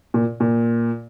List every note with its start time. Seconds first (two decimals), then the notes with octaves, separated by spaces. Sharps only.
0.14 A#2
0.40 A#2